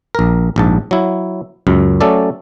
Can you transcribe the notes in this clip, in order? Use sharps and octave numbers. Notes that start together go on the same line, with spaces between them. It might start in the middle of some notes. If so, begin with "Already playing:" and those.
A#1 A#4
A#1 G#2 A5
F#3 E4
C#2 F#2
F#3 A3 C#4 A4 D5